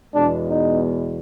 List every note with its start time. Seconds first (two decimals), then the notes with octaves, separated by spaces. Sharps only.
0.15 E2 B2 G#3 D4
0.50 D#4